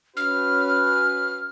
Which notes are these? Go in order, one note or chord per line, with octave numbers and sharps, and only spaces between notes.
C#4 F#4 B4 F6